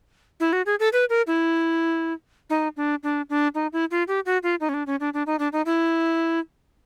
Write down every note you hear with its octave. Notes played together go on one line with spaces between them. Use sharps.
E4
F#4
G#4
A4
B4
A#4
E4
D#4
D4
D4
D4
D#4
E4
F4
G4
F#4
F4
D#4
C#4
D4
C#4
D4
D4
D#4
D4
D#4
E4